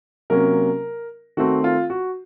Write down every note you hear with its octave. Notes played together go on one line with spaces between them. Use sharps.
C3 F#3 A#3 C#4 A#4
D#3 A3 C4 F#4
F4
F#4